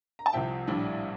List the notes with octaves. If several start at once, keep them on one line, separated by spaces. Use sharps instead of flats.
A#5
A5
C2 C3 F3 E5 G5
A#1 A2 G3 D4